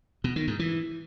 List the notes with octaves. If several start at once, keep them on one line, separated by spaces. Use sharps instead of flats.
B2
D#3
G#2
E3